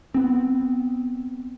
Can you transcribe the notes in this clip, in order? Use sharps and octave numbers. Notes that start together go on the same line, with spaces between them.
B3 C4